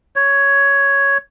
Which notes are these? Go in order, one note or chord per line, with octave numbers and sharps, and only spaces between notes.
C#5